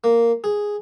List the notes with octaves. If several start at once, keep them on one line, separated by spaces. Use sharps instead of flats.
A#3
G#4